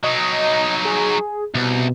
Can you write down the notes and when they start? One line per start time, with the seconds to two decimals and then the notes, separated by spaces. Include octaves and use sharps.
0.03 F#3 D#4 D#5
0.85 G#4
1.55 C2 B2